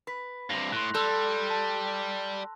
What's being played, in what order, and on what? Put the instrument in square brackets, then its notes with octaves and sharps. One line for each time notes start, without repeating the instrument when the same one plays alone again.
[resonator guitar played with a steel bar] B4 [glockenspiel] B5 B6
[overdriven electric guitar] G2 C3 [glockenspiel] A#6 F7 F#7
[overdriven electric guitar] A2 [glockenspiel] C6 F#6
[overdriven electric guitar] G3 [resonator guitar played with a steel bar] A4 [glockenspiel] C6 E6 F#6
[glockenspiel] A5